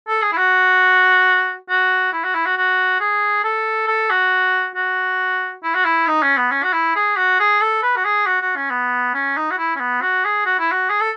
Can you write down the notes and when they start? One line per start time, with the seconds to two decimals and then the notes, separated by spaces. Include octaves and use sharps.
0.09 A4
0.22 G#4
0.32 E4
0.37 F#4
1.69 F#4
2.13 E4
2.24 F#4
2.35 E4
2.46 F#4
2.57 F#4
3.01 G#4
3.44 A4
3.88 A4
4.10 F#4
4.76 F#4
5.63 E4
5.75 F#4
5.85 E4
6.07 D#4
6.23 C#4
6.37 B3
6.52 C#4
6.64 F#4
6.73 E4
6.96 G#4
7.17 F#4
7.40 G#4
7.61 A4
7.83 B4
7.96 F#4
8.05 G#4
8.27 F#4
8.42 F#4
8.56 C#4
8.71 B3
9.14 C#4
9.37 D#4
9.51 F#4
9.58 E4
9.76 C#4
9.80 B3
10.02 F#4
10.25 G#4
10.46 F#4
10.59 E4
10.72 F#4
10.90 G#4
11.01 A4